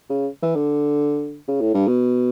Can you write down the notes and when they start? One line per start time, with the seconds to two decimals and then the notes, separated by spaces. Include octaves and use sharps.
0.09 C#3
0.42 E3
0.55 D3
1.48 C#3
1.61 A2
1.74 G2
1.87 B2